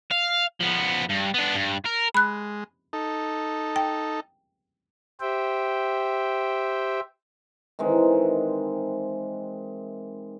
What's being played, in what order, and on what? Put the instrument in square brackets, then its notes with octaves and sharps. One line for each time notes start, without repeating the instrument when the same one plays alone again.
[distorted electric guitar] F5
F3 B3
G2
B3 D4
G2
A#4
[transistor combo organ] G#3 [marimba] B5 F#6
[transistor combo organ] D#4 A4
[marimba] G5
[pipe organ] G4 C5 E5 G5
[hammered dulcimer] D#3 E3 G#3 C4